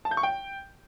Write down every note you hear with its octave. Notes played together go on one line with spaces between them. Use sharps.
A5
G6
C#6
G5